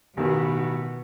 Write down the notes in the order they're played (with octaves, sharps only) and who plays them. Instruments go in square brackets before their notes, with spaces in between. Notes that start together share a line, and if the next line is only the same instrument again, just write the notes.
[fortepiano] A1 D#3 [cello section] B2 B3